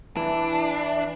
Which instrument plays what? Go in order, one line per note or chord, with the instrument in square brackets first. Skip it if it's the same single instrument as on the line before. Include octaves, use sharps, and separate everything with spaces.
[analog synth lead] E3 [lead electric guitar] D4